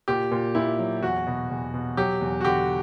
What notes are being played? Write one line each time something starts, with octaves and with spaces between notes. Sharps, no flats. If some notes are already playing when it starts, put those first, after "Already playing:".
A#2 G4
A#2
A#2 E4
F#3
E2 F#4
B2
E2
B2
F#3 G4
E2
F#4
D3 G4